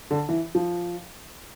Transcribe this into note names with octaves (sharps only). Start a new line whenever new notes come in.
D3
E3
F3